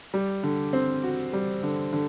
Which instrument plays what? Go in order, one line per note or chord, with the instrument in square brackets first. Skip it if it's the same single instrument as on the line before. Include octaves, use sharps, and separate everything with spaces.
[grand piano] G3
D3
C4
F#4
G3
D3
D3